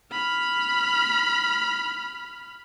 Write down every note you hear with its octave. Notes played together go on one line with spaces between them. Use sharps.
B5 F6